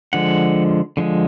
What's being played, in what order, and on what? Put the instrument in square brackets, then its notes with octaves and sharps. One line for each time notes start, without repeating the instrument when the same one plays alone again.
[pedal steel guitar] D3 F3 G#3 F#5
D3 F3 G#3